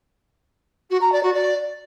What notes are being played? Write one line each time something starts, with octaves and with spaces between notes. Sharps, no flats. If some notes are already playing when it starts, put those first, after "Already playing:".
F#4
A#5
D5
F#4
D5